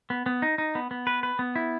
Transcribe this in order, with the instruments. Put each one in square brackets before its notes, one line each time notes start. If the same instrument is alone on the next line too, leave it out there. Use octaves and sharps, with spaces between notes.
[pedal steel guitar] B3
B3
D#4
D#4
B3
B3
B4
B4
B3
E4